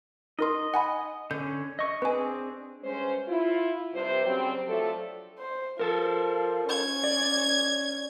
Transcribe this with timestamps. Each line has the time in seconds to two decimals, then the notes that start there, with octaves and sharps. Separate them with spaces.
0.39 D#4 A#4 D#5 C6
0.74 F#5 G#5 B5
1.31 D3 C#4 G6
1.79 D#5 C#6
2.02 C4 D4 G#4 B4 G#5
2.83 G2 G#3 C#4 C5
3.28 E4 F4
3.94 G2 C3 C5
4.25 C#3 F#3 G3 C4
4.67 F3 F#3 A3 D4 A4
5.38 C5
5.79 F3 A4 A#4
6.69 C#4 G#6
7.04 D5